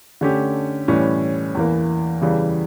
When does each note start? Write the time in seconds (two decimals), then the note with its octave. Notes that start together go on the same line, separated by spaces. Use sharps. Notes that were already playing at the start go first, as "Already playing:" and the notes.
0.21 D3 A3 C#4 G4
0.88 A2 E3 G3 C#4
1.55 E2 E3 A#3
2.22 E2 C#3 E3 G3